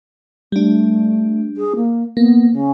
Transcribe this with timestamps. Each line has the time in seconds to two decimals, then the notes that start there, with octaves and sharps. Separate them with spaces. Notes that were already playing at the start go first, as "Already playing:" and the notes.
0.52 G3 A3 D4
1.56 G#4
1.76 A#3
2.17 A#3 B3
2.51 C#3